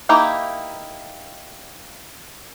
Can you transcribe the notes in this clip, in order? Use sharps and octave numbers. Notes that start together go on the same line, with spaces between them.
A#3 D#4 E4 G4